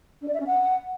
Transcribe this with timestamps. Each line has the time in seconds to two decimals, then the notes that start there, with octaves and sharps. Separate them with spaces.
0.21 D4
0.28 D5
0.34 E5
0.40 C#4
0.46 F#5